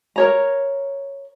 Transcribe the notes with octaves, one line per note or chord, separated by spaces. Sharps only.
A#4 C#5 A#5